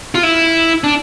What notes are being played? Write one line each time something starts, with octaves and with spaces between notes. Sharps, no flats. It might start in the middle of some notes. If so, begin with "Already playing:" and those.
F4
E4
D4